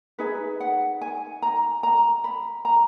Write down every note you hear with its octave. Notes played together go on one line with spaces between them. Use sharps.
D#4 G#4 B4 E5
F#5
G#5
A#5
A#5
B5
A#5